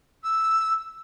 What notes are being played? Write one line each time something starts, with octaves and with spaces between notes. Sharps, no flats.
E6